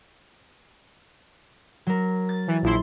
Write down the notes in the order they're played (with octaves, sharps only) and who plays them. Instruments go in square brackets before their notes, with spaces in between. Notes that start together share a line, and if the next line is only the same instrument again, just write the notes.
[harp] F#3 A#4
A6
[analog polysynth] E3
A#1 E4 C6